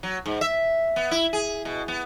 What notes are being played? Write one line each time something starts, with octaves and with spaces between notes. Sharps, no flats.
F#3
G#2
E5
B3
E4
G#4
B2
B3